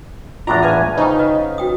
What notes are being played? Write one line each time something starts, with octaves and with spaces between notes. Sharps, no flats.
E2 A2 D4 F4 A#5 C#6
B4 F5 G#5
C#3 C#4 D#4 C5 G5
B4 D#5 F#5
F#4 G5 D#6